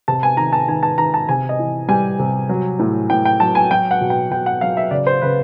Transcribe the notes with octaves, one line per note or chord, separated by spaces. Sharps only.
C3 A5
G#5
D#3 A#5
A5
D#3 G#5
A5
D#3 A#5
A5
C3 G#5
D#5
E3
G3 G#5
C3
F#3
A2
A2 G5
G5
F#3 A5
G#5
F#3 G5
F#5
B2
G5
B2 G5
F#5
F#3 F5
E5
C#3 D5
C5
C#3 B4